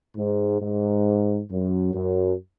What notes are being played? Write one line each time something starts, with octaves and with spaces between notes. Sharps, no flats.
G#2
G#2
F#2
F#2